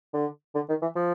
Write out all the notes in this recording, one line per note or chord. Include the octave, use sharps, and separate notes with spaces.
D3
D3
D#3
E3
F3